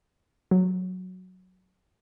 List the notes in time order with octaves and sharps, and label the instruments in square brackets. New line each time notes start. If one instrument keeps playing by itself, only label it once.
[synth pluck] F#3